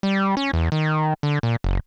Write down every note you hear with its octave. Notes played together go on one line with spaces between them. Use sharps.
G3
C#4
E2
D#3
D3
A#2
F#1